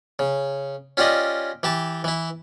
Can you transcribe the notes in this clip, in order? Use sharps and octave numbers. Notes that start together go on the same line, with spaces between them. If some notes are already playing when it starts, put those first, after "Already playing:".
C#3
C#4 F4 G4 D5 D#5
E3 G4 A5
E3 E4